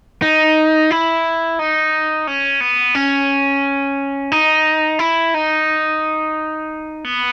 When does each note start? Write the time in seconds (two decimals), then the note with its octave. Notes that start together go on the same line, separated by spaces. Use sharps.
0.22 D#4
0.91 E4
1.59 D#4
2.27 C#4
2.61 B3
2.95 C#4
4.32 D#4
4.99 E4
5.34 D#4
7.05 B3